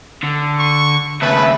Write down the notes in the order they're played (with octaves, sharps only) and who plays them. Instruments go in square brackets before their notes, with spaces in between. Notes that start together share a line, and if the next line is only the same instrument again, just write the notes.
[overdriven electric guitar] D3
[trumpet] C#6
[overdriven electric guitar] D#2 C#3 [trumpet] B4 [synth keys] E5 A5 B5